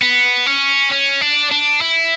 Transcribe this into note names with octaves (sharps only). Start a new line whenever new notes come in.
B3
C#4
C#4
D4
D4
E4